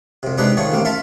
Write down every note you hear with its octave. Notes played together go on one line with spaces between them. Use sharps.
F2 C3
C3 G#3 D4 D#4 G#4 B4
D#3 F3 A3 G#4 C#5
A1 A#3 C4
E4 F4 A4 E5 B5